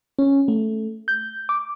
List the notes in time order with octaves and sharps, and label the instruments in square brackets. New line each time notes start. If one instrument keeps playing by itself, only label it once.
[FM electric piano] C#4
A3
G6
D6